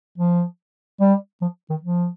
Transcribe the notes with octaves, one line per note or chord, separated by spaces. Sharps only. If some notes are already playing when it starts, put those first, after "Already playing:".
F3
G3
F3
D#3
F3